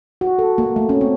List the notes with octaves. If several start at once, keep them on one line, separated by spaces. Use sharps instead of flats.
F#4
A4
A#3
A3
C#4
C4